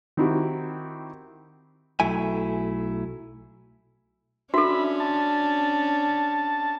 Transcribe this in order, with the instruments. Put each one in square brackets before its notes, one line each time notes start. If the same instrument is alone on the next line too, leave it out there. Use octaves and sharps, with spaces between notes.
[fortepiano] D#3 C4 D#4 E4 F#4 G4
[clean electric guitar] B1 F#3 A3 E4 G#5
[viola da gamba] C#4 D4 [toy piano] F#4 A4 [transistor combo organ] E5 B5
[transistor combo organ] A5